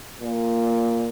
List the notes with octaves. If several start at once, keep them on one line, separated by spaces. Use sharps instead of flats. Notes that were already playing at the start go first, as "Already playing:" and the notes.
A#2